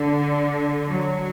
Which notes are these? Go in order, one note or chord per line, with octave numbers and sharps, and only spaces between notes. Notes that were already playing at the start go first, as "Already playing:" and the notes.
Already playing: D3
F#3